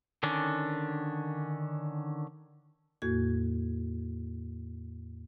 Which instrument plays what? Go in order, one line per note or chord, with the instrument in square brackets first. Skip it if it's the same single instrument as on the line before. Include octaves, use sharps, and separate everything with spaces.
[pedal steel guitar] D3 D#3 C#4 D4
[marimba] E2 A2 A#3 F#4 G#6